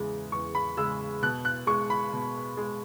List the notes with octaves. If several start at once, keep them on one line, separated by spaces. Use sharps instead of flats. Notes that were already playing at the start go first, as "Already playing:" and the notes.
Already playing: E2 C#3 G#3
E2 C#6
B5
C#3 G#3 E6
B2 F#6
F#6
G#3 C#6
B5
B2
G#3